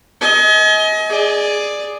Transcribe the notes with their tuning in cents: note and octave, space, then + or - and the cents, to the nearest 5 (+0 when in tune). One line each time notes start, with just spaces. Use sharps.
D#5 +30 G#5 +35
G#4 +5 D5 +10